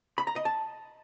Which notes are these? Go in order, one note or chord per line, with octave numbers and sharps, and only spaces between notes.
B5
A#5
D#5
A5